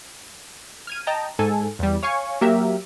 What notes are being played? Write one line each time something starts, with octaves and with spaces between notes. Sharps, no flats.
F6 G#6 D#7
D#5 G5 A5 A#5
G#2 A4 G#5
E2 G3
C#5 F5 G#5 C#6
F#3 A#3 G4 A#4 E5